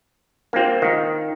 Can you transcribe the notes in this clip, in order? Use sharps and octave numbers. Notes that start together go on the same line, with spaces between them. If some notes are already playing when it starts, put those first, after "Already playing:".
A#3 C4 D4 F4
D#3 D#4 F5